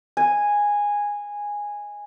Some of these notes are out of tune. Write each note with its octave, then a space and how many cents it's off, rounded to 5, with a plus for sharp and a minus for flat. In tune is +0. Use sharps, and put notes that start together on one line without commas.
D#5 +15 G#5 -10